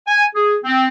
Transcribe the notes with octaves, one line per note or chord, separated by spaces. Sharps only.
G#5
G#4
C4